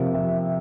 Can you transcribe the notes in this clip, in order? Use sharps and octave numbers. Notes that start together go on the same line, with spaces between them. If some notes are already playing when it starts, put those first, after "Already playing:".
Already playing: C3 F3 A#3
E5